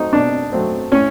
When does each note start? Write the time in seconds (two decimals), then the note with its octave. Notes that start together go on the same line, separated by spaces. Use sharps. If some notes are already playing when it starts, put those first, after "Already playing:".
Already playing: F#3 A3 C4 D#4
0.13 B2 D4
0.52 F#3 A3 C4
0.92 A2 C#4